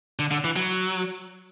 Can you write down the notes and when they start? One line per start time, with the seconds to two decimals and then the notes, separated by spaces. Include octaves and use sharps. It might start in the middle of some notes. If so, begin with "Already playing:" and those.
0.19 D3
0.31 D3
0.44 E3
0.56 F#3